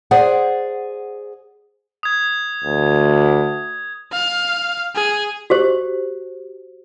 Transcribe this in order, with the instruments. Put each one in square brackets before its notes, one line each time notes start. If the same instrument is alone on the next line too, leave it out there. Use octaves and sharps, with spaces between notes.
[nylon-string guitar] G#4 C5 D5 F#5
[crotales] D#6 G#6
[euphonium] D2
[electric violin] F5
G#4
[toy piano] F#4 G4 C5